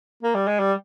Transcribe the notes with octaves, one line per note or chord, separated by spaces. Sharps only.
A#3
G3
G#3
G3